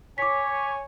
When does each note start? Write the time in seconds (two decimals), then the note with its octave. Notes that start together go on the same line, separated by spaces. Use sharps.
0.18 C#5 G#5 D6 B6